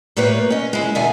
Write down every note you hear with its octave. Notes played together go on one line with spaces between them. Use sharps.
A2 G3 A#3 B4 C#5
C#4 D#5
G#3 E4
E2 B2 D3 E5 G#5